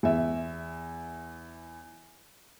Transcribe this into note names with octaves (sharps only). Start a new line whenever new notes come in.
E2 E5